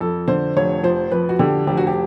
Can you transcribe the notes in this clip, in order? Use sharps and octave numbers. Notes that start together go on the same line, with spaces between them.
F2 A4
D3 C5
F1 C#5
F3 C5
F2 B4
F#4
D3 G4
F1 G4
F#4
G4